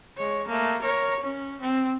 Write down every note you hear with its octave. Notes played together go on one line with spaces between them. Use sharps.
G#3 C#5
A3 A#3
A#4 C#5
C#4
C4